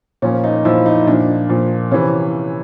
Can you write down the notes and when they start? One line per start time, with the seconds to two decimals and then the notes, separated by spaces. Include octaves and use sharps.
0.22 A#2 F3 C#4
0.44 D#4
0.65 A#2 F3 E4
0.86 D#4
1.06 A#2 F3 D4
1.49 A#2 F3
1.91 C3 E3 C#4